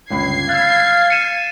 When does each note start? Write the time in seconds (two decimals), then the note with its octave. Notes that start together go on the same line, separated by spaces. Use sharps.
0.10 G1 C#2 B5 G#6 C7
0.49 F5 E6 F#6 A6
1.10 C#7 D#7 E7